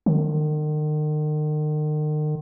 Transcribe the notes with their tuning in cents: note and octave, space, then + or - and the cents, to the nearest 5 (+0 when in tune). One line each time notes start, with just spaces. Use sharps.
D#3 -40